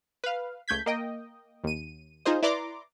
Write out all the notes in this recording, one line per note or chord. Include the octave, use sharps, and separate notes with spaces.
B4 F5
C#2 A3 G6 G#6 B6
A#3 D#5 G5
D#2 D#7
D#4 F4 G#4 C5 D#5
E4 B4 D5 A#5 C6 D6